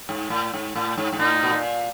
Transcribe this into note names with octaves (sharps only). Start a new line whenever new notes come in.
G#2
A2
G#2
A2
G#2
G#2
A2 D#4
B2
A#2